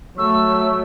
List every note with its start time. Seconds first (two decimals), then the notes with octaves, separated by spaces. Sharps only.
0.18 F#3 A3 C#6 E6